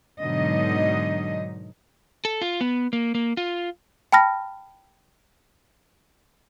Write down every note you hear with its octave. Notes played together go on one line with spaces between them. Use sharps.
G#2 B2 D3 F#3 D#4 D#5
A4
F4
B3
A#3
A#3
F4
G5 A5 B5 F6 A#6